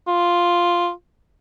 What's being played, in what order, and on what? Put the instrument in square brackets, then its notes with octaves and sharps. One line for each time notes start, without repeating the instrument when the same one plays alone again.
[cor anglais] F4